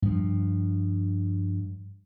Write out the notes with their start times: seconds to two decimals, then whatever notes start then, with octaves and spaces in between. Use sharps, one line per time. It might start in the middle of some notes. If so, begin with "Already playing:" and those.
0.02 G2 F3